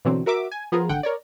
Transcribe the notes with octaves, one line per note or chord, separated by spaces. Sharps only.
B2 D3 E3 F#3 C4
F#4 A#4 E5 D6
G#5
F3 B3 F4 G#4 A#4
G#1 D3 F#5 G5
A#4 C#5 D5